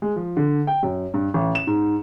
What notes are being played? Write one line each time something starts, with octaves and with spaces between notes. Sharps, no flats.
G#3
F3
D3
G5
F#2
G2
A1
E7
G#2